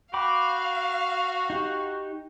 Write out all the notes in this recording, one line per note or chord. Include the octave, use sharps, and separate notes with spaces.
F#4 F5 G5 B5 D6
D#4 G4